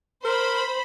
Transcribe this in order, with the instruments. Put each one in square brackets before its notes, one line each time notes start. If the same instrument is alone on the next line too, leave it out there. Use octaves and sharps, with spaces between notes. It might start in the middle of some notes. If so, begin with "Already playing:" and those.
[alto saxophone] A#4 [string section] C5 B5